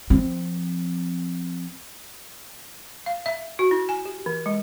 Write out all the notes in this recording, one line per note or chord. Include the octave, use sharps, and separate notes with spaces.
F3 C4
F5
E5
F#4
E4
G#5
G4
E3
G#3